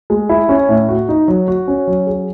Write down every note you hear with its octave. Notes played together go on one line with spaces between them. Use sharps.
G#3
E4
C#4
A2
F#4
D#4
F#3
F#4
C#4
F#3
G#4